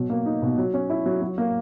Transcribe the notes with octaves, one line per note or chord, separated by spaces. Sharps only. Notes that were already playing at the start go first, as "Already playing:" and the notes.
Already playing: B2 F#3
A#3
D#4
B2
F#3
C#4
E4
F#3
F#3
A#3